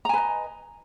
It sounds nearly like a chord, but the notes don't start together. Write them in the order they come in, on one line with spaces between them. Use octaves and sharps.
A#5 G#5 B4 D#5